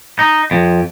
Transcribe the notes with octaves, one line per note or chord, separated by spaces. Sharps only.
D#4
F2